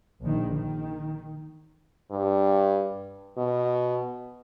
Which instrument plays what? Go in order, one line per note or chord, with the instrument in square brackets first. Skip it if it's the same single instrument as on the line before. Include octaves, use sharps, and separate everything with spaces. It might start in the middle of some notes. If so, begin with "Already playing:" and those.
[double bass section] A#1 D#3
D#3
[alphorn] G2
B2